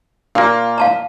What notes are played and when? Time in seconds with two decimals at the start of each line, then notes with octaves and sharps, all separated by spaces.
0.35 A#2 A#3 F4
0.78 F5 A5 A#5